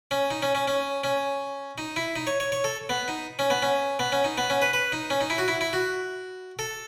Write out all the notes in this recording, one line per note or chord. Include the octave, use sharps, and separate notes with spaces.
C#4
D#4
C#4
C#4
C#4
C#4
D#4
E4
D#4
C#5
C#5
C#5
A4
B3
D#4
C#4
B3
C#4
B3
C#4
D#4
B3
C#4
B4
B4
D#4
C#4
D#4
E4
F#4
E4
E4
F#4
A4